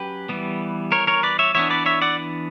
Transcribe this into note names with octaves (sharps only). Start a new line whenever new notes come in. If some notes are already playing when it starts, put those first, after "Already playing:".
Already playing: F#3 C#4 G4 B4
E3 G3 B3
A#4 C#5
A#4 C#5
B4 D5
C#5 E5
E3 B3 D4 C#5 E5
B4 D5
C#5 E5
D5 F#5